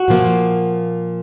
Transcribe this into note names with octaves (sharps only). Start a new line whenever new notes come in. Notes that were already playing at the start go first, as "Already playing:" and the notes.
Already playing: F#4
A#2 F3 A#3